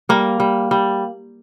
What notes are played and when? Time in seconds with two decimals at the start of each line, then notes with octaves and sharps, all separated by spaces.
0.09 G3 A#3
0.40 G3
0.71 G3